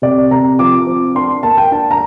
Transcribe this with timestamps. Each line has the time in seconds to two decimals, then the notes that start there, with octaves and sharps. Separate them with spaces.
0.02 C3 D5
0.31 C3 A#5
0.59 F3 D6
0.87 C4
1.15 D4 C6
1.43 A#3 A5
1.58 G5
1.72 D4 A5
1.91 A#5